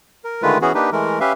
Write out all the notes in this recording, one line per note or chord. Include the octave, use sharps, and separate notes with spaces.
A#4
D3 D#3 G#3 A3 F4 B4
E3 B3 C#4 F#4 G#4
A#3 D4 D#4 G4 B4
E3 G#3 A3 A#4
C#4 G4 B4 E5 F5